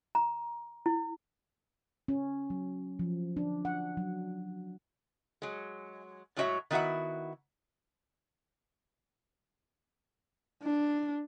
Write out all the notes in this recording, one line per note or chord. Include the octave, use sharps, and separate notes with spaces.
A#5
E4
C#4
F#3
F3
D4
F#5
F#3
F#3 G#3
A2 F#3 G#3 F#4 C#5 E5
D#3 B3 E4 F#4 E5 F#5
D4